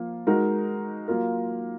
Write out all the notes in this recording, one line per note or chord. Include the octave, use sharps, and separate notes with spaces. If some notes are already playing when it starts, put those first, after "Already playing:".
Already playing: F3 A#3 F4
G#3 D#4 F#4 A#4
F#3 A#3 F4 A#4